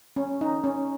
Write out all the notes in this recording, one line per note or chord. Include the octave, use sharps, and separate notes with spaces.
C#4
D#4
C#4